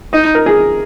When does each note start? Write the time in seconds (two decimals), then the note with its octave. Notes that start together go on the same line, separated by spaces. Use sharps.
0.13 D#4 D#5
0.35 A#4
0.46 G#4